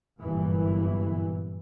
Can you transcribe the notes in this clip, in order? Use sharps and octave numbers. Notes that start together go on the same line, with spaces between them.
G1 F#2 A#2 E3